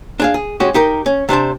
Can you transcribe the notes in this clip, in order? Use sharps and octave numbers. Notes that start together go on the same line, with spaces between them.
D4 G#4 F5
G#4
G#3 C#4 F#4 G4
D#4 G4 A#4
C#4
C3 D4 C5 A5